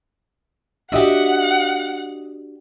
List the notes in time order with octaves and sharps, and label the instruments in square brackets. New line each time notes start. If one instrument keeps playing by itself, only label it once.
[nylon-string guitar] D4 F#4 G4 [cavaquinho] D#5 E5 [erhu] F#5